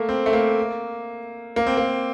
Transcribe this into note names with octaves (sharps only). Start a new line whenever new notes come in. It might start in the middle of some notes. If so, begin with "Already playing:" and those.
Already playing: A3 A#3
C4
A3
A#3
A#3
C4
A#3